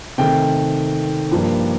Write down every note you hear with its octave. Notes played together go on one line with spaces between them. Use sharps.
C3 D#3 A3 G5
G2 F3 A#3